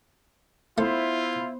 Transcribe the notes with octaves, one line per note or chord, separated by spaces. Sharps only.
A3 B3 E4 F4 C5